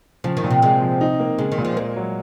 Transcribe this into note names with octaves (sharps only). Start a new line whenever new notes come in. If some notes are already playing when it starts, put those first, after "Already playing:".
C#3 F3
D#3
A#2
C3
C3 G#3
F3
D#4
A#3
C#3 G#3
D#3
A#2
F3
G#3 A#3
F#3